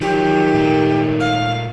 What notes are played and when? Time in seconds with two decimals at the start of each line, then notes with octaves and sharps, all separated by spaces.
0.01 D#3 F3 F#3 G4
0.54 A#2 A3 A#3
1.20 F5